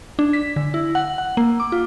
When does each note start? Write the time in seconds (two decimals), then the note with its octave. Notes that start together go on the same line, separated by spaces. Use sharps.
0.19 D4
0.33 B6
0.56 D3
0.74 E4
0.95 F#5
1.18 F#5
1.37 A#3
1.60 D6
1.72 F4